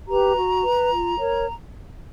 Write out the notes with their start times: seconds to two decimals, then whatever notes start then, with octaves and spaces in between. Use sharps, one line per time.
0.08 G4 B4 A#5
0.36 F#4
0.63 B4
0.91 F4
1.18 A#4 C#5